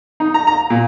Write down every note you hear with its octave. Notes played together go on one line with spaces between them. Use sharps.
D#4
A#5
A#5
A#2